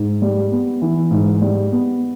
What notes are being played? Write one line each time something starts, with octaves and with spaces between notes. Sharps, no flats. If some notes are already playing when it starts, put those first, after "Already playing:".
Already playing: G#2
G3
B3
E3
G#2
G3
B3